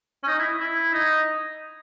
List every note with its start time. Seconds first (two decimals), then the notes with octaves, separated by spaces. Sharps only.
0.24 C#4
0.27 D#4
0.39 E4
0.60 E4
0.93 D#4